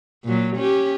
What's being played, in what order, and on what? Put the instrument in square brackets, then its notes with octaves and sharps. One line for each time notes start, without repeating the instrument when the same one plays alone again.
[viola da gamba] A#2 F#3
C#4 G4